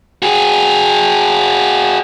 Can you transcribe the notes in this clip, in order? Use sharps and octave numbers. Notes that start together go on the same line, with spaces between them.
F#4 G#4